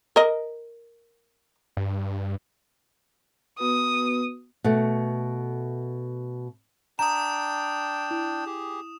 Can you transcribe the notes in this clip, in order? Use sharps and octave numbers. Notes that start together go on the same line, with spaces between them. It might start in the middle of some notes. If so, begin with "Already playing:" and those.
A#4 D#5
G2
B3 F#4 B4 D#6
B2 A3
D4 G5 A#5 D#6 E7
E4
G4 G#4